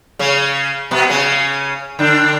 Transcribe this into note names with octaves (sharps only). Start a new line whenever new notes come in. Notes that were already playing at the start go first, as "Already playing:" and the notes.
C#3 C#4
B2 B3
C#3 C#4
D3 D4